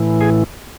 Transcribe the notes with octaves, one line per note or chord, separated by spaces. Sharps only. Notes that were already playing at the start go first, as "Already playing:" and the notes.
Already playing: A2 E3
G#4